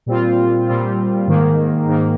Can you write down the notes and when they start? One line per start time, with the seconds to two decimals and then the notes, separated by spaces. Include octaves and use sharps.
0.06 A#2 G3 C4 F4
0.67 A#2 G3 C4 F4
1.27 G#2 D#3 A#3
1.87 G#2 D#3 A#3